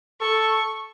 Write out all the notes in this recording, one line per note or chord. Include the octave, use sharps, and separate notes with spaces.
A4 C#6